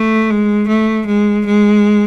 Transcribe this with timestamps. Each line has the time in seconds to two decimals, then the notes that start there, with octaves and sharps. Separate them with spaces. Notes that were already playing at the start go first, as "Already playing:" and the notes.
Already playing: A3
0.30 G#3
0.68 A3
1.07 G#3
1.46 G#3